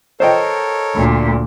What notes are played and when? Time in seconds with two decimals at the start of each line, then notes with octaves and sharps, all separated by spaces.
0.20 A4 A#4 C5 C#5 D#5 G5
0.95 D2 A#2